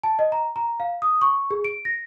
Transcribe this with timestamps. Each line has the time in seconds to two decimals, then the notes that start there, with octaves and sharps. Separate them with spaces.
0.03 A5
0.19 D#5
0.32 A#5
0.56 A#5
0.80 F5
1.02 D#6
1.21 C#6
1.51 G#4
1.64 D7
1.85 A#6